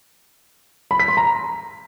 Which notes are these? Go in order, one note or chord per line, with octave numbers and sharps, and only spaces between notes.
B5
B6
C6
A#5